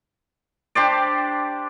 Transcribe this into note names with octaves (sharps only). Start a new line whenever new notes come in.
D4 G4 C5 D5